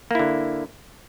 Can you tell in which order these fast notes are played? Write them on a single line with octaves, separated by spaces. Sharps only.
A#3 E4 D3